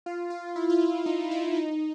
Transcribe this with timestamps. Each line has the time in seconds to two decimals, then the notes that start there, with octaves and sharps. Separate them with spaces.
0.06 F4
0.30 F4
0.56 E4
0.70 F4
0.81 E4
1.06 D#4
1.31 E4
1.56 D#4